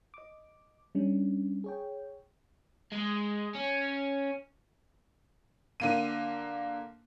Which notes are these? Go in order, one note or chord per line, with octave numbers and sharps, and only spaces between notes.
D#5 D6
G3 C#4 D4
G#4 C#5 G5
G#3
C#4
D3 A#3 D#7